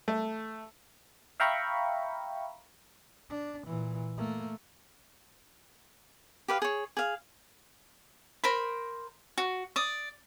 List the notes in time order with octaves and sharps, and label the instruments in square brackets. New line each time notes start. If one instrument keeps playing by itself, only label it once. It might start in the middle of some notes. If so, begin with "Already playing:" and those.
[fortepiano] A3
[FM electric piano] E5 F5 G5 A#5 B5 C#6
[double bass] D4
A#2 E3
A3 A#3
[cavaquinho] G4 B4 F5
G#4 C#5
G#4 F5
A#4 C5 B5
F#4
D5 D#6